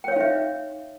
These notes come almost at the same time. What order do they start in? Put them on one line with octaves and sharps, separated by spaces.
G5 C#5 F5 D#4 E5